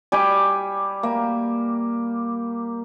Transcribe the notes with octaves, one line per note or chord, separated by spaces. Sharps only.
G3 G4 G#5 D6
A#3